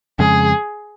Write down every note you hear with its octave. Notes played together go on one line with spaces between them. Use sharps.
F2 C#3 G#3 G#4